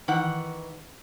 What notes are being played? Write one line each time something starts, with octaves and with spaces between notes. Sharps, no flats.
D#3 E3 F#5